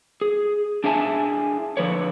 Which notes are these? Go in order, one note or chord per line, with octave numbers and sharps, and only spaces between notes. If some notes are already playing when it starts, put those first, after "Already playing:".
G#4
D4 E4 G#4 E5 G#5 A5
D3 F3 B4 C#5